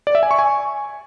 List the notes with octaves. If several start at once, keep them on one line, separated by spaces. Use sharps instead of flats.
D5
E5
G#5
C#6
G#5